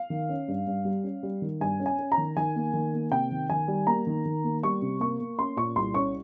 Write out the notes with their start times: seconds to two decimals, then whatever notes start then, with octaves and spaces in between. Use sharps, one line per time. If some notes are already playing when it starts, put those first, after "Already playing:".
Already playing: F5
0.10 D#3
0.29 C#4
0.48 G2
0.67 G2
0.85 G3
1.04 C#4
1.23 G3
1.42 D#3
1.61 G2 G#5
1.80 C#4
1.86 G#5
1.99 C#4
2.12 A#5
2.18 D#3
2.37 D#3 G#5
2.56 A#3
2.73 D#3
2.94 A#3
3.11 C3 G5
3.31 D#3
3.50 D#3 G#5
3.68 G3
3.87 A#3 A#5
4.07 D#3
4.25 D#3
4.44 A#3
4.63 G3 C#6
4.82 C3
5.00 A#3 C#6
5.20 A#3
5.39 C#4 C6
5.57 A#2 C#6
5.76 C2 C6
5.94 C#4 C#6